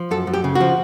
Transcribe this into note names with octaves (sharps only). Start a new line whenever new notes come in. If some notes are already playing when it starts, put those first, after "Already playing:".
Already playing: F3
F#2 A4
F#2
G4
C#3
F#4
F3